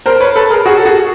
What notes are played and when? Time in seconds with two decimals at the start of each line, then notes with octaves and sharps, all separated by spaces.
0.06 A#4 C5
0.20 B4 C#5
0.36 A4 B4
0.51 G#4 A#4
0.66 F#4 G#4
0.77 A4
0.85 F#4 G#4